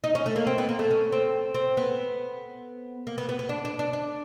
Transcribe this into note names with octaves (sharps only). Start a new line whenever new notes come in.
D#4
C#4
A3
A#3
C4
B3
A#3
A3
C#4
C4
C4
B3
A#3
B3
B3
B3
D4
D4
D4
D4